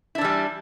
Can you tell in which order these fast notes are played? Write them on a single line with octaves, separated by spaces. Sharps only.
E4 D4 E3 G3